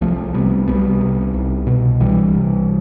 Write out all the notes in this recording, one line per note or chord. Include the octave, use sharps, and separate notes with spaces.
C2 F3 A3
C3 G3 B3
C2 G3 B3
C3
C2
B2
C2 E3 G3
C3